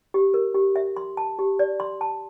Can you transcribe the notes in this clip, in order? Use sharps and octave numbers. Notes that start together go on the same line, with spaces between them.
G4
A#4
G4
E5
C6
A5
G4
D5
C6
A5